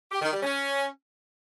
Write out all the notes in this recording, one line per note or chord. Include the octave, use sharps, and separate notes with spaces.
G4
D#3
G3
C#4